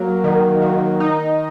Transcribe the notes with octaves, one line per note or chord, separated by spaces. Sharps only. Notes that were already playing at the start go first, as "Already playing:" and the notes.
Already playing: F#3 A#3
D#3
D#3
D#4